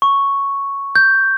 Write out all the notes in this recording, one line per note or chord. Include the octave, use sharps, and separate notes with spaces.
C#6
G6